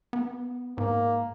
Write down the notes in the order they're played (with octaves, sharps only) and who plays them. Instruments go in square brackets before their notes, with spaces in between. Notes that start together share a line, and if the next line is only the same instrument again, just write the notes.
[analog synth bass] B3
[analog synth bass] G#2 [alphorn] A#3